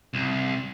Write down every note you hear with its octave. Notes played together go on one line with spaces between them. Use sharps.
C2